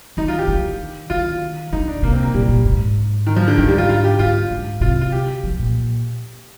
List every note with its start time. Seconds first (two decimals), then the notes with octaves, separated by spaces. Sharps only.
0.17 D#3 D#4
0.28 F4
0.39 G4
0.48 D#3
1.10 D#3 F4
1.73 D3 D#4
1.88 D4
2.02 C3 A#3
2.13 C4
2.23 A#3
2.34 A#2 G3
2.49 A#2
2.65 G#2
3.26 D#3
3.36 F3
3.48 D3
3.58 G#2 D#3
3.68 G3
3.78 F4
3.89 F4
4.04 G4
4.19 G2 F4
4.50 G#2
4.81 C3 F4
5.01 F4
5.12 G4
5.44 F3
5.59 A#2